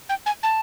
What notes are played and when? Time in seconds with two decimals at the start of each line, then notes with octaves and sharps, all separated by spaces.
0.09 G5
0.26 G#5
0.43 A5